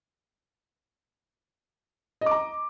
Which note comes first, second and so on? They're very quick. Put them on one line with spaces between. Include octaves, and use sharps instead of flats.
D#5 D6 A#5